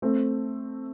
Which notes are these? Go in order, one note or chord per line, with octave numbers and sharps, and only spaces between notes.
A3 C4